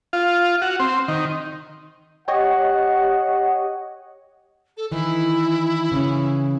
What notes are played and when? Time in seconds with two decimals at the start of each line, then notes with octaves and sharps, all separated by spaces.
0.13 F4
0.62 F#4
0.80 C4
1.08 D#3
2.28 G4 C#5 D#5 F#5
4.77 A4
4.91 D#3 E3 E4
5.92 C#3 E3 C#4